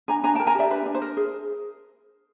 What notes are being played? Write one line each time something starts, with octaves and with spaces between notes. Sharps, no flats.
D4 G#5 A#5
D4 G#5 A#5
G5 A5
A#4
G#5 A#5
G4 D5 E5
D4 B4
D4
C5
A#4
G#4